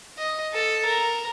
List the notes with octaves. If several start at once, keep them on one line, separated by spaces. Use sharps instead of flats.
D#5
A4
A#4